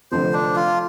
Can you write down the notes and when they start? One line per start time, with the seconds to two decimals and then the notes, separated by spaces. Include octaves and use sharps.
0.12 F1 F2 D3 C5
0.33 D4
0.56 F4